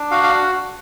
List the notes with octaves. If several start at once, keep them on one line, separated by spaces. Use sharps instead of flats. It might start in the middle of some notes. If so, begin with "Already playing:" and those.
Already playing: D4
F#4 F5
F5